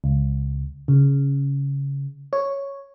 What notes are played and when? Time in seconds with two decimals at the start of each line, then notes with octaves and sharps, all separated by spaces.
0.04 C#2
0.88 C#3
2.33 C#5